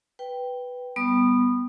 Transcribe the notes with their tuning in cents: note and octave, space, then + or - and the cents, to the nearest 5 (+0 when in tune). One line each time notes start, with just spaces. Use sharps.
B4 +0 G5 +0
G3 +0 B3 +0 D#6 -20